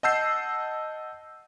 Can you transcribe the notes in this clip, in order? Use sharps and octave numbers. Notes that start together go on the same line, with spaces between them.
D#5 F#5 A5 E6 G6 C7